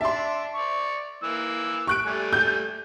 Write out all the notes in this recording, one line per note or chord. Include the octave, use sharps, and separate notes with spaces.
D4 E5 A5 C6
D5 C#6
E3 A#3 E6
C#6 F#6 D7
G3 A3 G#5
G6